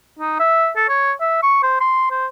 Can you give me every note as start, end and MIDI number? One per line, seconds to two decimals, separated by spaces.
0.19 0.40 63
0.40 0.70 76
0.76 0.86 69
0.89 1.12 73
1.20 1.41 76
1.43 1.58 85
1.63 1.77 72
1.81 2.09 84
2.11 2.27 72